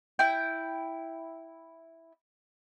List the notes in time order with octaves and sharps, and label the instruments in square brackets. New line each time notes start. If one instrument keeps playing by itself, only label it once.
[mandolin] E4 G5